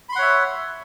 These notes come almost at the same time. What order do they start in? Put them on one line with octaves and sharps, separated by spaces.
B5 C6 F#5 C#5 E5